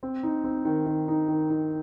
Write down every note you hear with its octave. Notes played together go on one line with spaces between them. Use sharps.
C4
D#4
C4
D#3
D#3
D#4
D#3
D#4